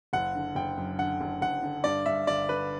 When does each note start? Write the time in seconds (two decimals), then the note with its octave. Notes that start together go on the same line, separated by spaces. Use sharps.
0.13 F#1 F#5
0.35 D3
0.55 F#1 G5
0.78 F#2
0.99 D3 F#5
1.21 F#1
1.42 F#1 F#5
1.63 D3
1.84 G2 D5
2.06 G2 E5
2.27 G1 D5
2.48 D3 B4